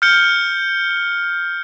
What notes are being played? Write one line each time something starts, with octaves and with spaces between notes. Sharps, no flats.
F6 G6 C#7 G7